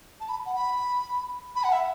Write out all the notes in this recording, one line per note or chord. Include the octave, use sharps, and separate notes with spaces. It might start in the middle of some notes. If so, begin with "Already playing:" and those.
A5
B5
F#5
B5
B5
F#5
E5